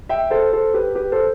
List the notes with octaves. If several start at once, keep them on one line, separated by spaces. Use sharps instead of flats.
E5 G5
A4 C5
A4 C5
G4 B4
G4 B4
A4 C5